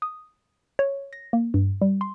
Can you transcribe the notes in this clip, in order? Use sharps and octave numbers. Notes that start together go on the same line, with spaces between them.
D#6
C#5
A#6
A#3
G2
G3
C6